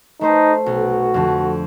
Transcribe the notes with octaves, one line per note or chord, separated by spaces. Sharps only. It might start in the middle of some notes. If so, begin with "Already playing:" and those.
A3 D#4 C5
B1 F#4
F2 D3